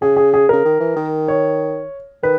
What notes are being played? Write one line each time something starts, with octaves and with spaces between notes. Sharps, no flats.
C#3 G#4
G#4
G#4
C#3 A#4
D#3
E3
D#3
C#5
D#3 B4